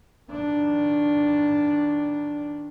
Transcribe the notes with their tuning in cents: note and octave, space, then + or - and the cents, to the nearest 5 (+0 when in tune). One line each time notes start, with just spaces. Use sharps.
D#3 +15 D4 +0